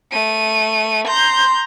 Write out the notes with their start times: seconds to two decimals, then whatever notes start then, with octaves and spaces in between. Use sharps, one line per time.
0.12 A3 D#7
1.07 A#5 C6 G6